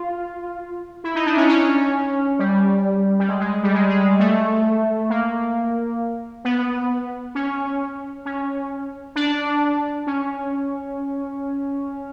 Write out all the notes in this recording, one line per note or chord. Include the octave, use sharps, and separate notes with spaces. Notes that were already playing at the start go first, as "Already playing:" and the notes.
Already playing: F4
E4
D#4
D4
C#4
C#4
G3
G3
G#3
G#3
G3
G#3
G#3
A3
A#3
B3
C#4
C#4
D4
C#4